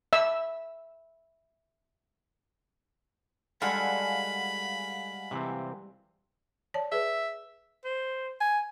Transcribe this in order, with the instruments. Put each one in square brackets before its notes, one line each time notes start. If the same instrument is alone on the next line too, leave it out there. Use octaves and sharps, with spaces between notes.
[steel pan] E5 E6
[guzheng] G3 G#3 F4 [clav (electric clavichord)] A4 [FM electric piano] F5 F#5 G#5 [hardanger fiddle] B5
[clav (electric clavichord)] C3 E3 C4
[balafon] C#5 D5 A5
[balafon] G#4 B4 [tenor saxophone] E5
[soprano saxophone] C5
G#5